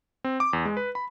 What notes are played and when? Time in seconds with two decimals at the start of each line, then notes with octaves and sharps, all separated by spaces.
0.24 C4
0.40 D6
0.53 E2
0.65 G#3
0.77 B4
0.95 B5